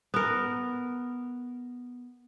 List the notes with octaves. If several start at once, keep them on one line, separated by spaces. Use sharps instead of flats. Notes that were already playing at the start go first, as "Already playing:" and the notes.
B3 A#4